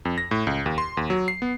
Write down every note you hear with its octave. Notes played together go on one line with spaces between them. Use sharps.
F2
A#6
A2
C#2
D#2
C6
D#2
F#3
C7
B3